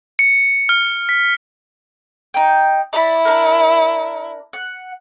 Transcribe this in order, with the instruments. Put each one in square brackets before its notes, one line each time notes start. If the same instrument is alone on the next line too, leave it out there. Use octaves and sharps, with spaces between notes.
[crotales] C#7
F6
B6
[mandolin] D#4 G5
[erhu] E4 [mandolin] D5 B5
[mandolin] D4 A#4
F#5